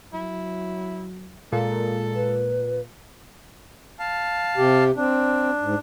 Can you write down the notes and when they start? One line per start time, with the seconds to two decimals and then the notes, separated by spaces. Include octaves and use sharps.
0.13 F#3 E4
1.52 A#2 G#3 A4
2.15 B4
3.99 F5 A5
4.57 C3 G4
4.97 C4 D4
5.61 G#2